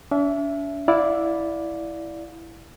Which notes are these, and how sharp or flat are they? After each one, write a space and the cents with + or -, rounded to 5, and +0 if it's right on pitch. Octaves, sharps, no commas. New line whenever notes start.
D4 -45 E5 +15
E4 +0 D5 -5 F5 +30